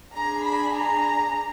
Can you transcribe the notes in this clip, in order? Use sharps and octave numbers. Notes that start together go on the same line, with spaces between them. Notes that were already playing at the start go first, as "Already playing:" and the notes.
D4 G#4 A#5
B5
A#5